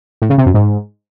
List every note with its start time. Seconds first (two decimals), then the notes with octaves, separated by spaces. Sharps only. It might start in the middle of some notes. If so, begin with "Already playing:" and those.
0.22 A2
0.30 C#3
0.38 C3
0.46 F#2
0.54 G#2